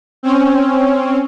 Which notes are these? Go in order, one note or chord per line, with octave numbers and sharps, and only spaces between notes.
C4 C#4